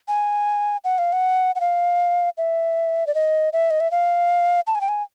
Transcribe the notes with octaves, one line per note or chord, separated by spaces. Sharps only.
G#5
F#5
F5
F#5
F#5
F5
E5
D5
D#5
E5
D#5
E5
F5
A5
G#5
G5
G#5